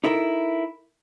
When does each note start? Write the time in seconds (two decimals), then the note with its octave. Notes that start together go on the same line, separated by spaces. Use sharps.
0.04 D#4 E4 A4 A#4